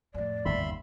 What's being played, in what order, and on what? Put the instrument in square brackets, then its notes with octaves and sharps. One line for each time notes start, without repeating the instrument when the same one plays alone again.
[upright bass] F2 A2 [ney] D5
[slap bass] G1 D#2 C#3 [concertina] E5 B5 C6